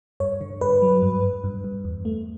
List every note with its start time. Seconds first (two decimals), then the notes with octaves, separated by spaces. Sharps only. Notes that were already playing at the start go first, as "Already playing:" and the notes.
0.20 G2 C#5
0.41 D3
0.61 G2 B4
0.82 F#3
1.02 G2
1.23 G2
1.44 G2
1.64 G2
1.85 E2
2.05 A3